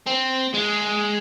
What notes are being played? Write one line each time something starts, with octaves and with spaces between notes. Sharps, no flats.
C4
G#3